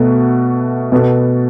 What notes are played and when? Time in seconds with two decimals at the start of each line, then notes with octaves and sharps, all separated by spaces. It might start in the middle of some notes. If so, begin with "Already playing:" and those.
Already playing: B2 A3 F#4
0.92 B2 B3 F#4 A4